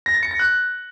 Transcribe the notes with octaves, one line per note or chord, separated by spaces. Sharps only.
A#6
A6
C#7
A#6
F#6